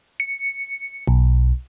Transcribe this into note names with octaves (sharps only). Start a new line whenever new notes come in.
C#7
B1